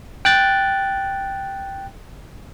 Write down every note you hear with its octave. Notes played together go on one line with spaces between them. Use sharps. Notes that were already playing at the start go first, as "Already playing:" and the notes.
G5 F#6 A6